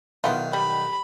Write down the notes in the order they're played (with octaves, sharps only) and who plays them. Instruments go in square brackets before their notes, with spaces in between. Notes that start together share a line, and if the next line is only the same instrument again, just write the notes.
[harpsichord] B1 D#3 [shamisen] B3 E4 F4
[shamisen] G3 [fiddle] B5